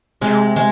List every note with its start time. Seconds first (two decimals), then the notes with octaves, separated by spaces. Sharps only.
0.21 C3 G#3
0.56 G#3